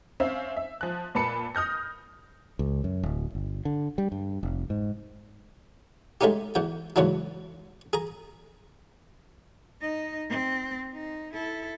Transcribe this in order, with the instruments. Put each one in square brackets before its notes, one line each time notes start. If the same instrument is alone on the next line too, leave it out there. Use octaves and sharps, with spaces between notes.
[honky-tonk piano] C4 C#4 C5 E5 F5
E5
F3 F#6
A#2 B4 A5 B5 C#7
D#6 F6 G6 A#6
[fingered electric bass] C#2
F#2
D1
G1
D3
G3
G2
F1
G#2
[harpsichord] G#3 A3 C#4 D#4 G4
E2 E3 G5
E2 G#2 C#3 E3 F#3 D4
G#4 A#5
[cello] D#4 D#5
C4
D#4
E4 A4